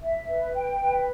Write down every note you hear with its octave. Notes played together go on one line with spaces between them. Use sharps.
E5
B4
G5
B4